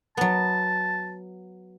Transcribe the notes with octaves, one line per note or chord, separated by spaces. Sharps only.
F#3 B3 A5